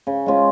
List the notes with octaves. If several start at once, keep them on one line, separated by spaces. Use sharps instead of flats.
C#3
G#3 C#4 F4